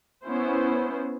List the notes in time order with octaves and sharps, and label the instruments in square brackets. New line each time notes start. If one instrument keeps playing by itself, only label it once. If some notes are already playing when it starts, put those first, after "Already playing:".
[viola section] B3 C#4 E4 C5